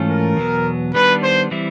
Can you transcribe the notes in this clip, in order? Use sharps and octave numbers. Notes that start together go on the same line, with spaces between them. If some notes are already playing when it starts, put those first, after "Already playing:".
Already playing: G#2 E3 A3 C#4 F4
A#4
E2 B2 F#3 B3
D#3 G3 B3 D4 B4
C5
E3 G3 C4 E4